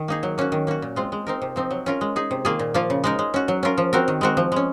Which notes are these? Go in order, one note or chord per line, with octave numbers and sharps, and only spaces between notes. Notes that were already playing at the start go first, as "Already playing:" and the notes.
Already playing: D#3
A#3 D#4 G#4
F#3
A#3 C#4 F#4
D#3
A#3 C#4 F#4
A#2
G#3 C4 F4
G#3
C4 D#4 A#4
C3
F3 C4 D#4
F#3
C#4 F4 A#4
G#3
D#4 G#4
C3
D#3 A#3 F4 G#4
A#2
F3 A#3 F4
C#3
G#3 D#4 A#4
G#3
C#4 F#4
F#3
C#4 F4 A#4
F3
C4 F#4 A#4
D#3
G#3 C4 F#4 A#4
F3
G#3 C#4